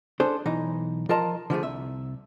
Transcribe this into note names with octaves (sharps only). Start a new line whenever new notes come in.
D4 G#4 A4 C5
B1 E3 D#4
F3 F4 A#4 D#5 A5 A#5
D3 F3 A3 G#4
C2 E5